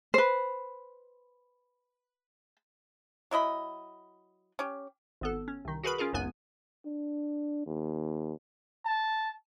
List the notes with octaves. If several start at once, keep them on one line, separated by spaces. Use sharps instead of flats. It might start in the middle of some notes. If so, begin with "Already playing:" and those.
B4 C5
F#3 E4 D#5 B5
C#4 G4
G#1 B3 A4
C#4
C2 D#3
F#4 G#4 A#4 B4 B5
C#4 F4 G#4 A#4
G#1 C#2 F#2 B3 G#5
D4
D#2
A5